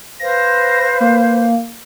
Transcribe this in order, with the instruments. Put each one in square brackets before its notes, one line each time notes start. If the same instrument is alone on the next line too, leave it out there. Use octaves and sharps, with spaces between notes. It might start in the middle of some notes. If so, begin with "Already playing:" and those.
[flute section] B4 C5 F5 [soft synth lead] A#6
[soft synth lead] A#3